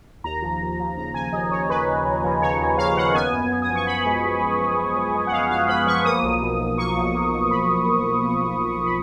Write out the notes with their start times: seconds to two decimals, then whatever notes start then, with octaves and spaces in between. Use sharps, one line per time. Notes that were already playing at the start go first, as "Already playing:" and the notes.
0.24 D#2 A#5
0.42 F3
0.61 D#2
0.79 F3
0.97 C#3 A#5
1.14 F3 G#5
1.33 D#2 D#5
1.51 D#2 C#5
1.69 D#2 B4
1.88 D#2
2.05 D#2
2.24 F3
2.42 C#3 C#5
2.60 D#2
2.78 D#2 F5
2.96 D#2 F#5
3.14 B3 G#5
3.33 F#2
3.50 B3
3.62 D#6
3.69 F3
3.75 C#6
3.87 F3 B5
4.05 G#3
4.24 F#2
4.42 B3
4.59 F3 B5
4.78 G#3
4.96 F3
5.15 G#3
5.27 F#5
5.32 G#3 F5
5.50 F#2 F5
5.68 B3 B5
5.87 F3 C#6
6.05 A#3 D#6
6.23 B1
6.41 B2
6.60 B2
6.78 A#3 C#6
6.96 B1
7.14 A#3
7.32 B2
7.51 B1 B5
7.68 B1
7.87 B2
8.05 B1
8.22 A#3
8.41 B1
8.59 B1
8.77 B1
8.86 B5